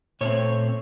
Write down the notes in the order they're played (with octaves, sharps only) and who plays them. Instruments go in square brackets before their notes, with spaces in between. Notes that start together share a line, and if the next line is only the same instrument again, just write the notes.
[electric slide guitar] A#2 A3 C4 C#5